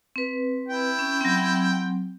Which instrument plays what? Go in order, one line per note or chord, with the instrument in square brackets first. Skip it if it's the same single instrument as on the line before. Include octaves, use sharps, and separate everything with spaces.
[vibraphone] C4 B4
[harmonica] E4 G5
[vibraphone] C#4
F#3 C4